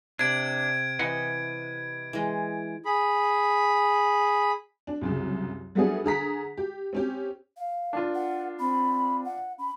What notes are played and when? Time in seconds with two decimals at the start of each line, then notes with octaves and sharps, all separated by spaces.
0.19 C3 D4 G#6 D7
0.99 E3 B4 D#5 F#5
2.13 E3 G#3
2.85 G#4 B5
4.87 D4
5.01 C2 F#2 C#3
5.75 F#3 G3 A3 B3 D4 G#4
6.04 D3 G#4 A#5 B6
6.57 G4
6.93 C4 C#4 G4
7.57 F5
7.93 D4 F4 A#4
8.15 F#5
8.59 C4 B5
9.25 F#5
9.58 C#4 B5